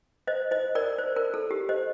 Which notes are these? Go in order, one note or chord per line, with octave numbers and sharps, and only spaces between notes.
C5 D#5
C5 D#5
A#4 D5
C5
A#4
A4
G4
C5 D#5